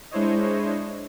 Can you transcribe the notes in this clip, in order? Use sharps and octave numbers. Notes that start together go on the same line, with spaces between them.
G#3 D4 E4 C5 C#5 D#5